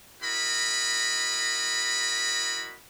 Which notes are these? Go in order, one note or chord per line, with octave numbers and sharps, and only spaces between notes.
E4 F#4 A#4 D#5 B5